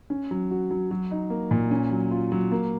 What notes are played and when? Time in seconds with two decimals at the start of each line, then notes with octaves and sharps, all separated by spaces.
0.10 C#4
0.31 F#3
0.51 F#4
0.71 F#3
0.91 F#3
1.11 D#4
1.30 A#3
1.51 A#2
1.71 C#4
1.91 F#3
2.11 F4
2.32 F#3
2.52 A#3